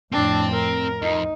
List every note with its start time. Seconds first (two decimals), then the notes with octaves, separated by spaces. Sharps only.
0.12 F2 A2 C4 D4 G5 A5
0.52 A#4
1.02 F2 D#4